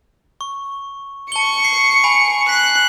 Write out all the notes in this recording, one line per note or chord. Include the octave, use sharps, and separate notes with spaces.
C#6
A5 C#6 C#7 G7
C7
G#5 B5
F#6 B6 C7